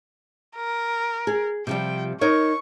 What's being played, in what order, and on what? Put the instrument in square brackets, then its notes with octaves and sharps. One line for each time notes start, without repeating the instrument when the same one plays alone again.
[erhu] A#4
[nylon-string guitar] G#4
[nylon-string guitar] C3 F3 G3 [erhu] G5
[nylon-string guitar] D#4 A#4 C#5 [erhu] C#6